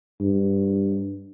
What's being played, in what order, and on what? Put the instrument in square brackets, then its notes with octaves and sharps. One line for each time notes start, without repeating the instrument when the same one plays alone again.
[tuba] G2